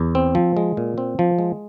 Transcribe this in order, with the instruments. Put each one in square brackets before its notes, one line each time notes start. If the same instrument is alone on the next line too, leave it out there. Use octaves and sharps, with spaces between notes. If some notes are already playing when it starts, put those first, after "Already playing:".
Already playing: [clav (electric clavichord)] E2
C4
F3
G#3
A#2
C4
F3
G#3